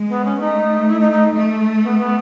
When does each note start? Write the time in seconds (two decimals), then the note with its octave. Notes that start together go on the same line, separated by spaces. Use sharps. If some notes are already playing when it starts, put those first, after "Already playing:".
Already playing: G#3
0.09 B3
0.25 C#4
0.40 A3 D#4
0.88 E4
1.00 D#4
1.11 D#4
1.35 A3
1.83 B3
1.99 B3